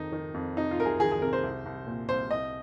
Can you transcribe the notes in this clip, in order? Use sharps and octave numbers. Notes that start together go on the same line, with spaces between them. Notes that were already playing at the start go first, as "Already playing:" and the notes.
Already playing: F2 D#3 D#4
D#3
F2
C3 D#4
F4
C2 A#4
G#4
D#3 G#4
G#4
C3 A#4
C5
C2
C2
A#2
C2 C5
C2 D#5